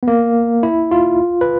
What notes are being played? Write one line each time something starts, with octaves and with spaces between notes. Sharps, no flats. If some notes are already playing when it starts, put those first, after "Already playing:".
B3
A#3
E4
F4
B4